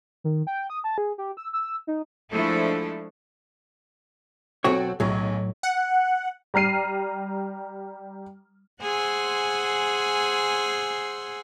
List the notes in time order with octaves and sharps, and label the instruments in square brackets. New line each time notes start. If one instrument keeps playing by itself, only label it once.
[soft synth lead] D#3
G5
D#6
A5
G#4
G4
E6
E6
D#4
[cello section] F3 G#3 A3 D4 E4 A4
[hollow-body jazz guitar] B1 F#4 C#5 [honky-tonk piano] C4 A4 G5
[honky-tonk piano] B1 G#4 [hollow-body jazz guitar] A2 F#3
[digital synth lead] F#5
[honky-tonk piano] G3 A#5 F6 C7 D#7
[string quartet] G#4 C5 F#5 G#5 C6 E6